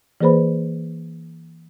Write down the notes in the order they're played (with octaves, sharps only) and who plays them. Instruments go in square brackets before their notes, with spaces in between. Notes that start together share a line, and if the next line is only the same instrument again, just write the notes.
[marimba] E3 A#3 G#4 B4 C5 B5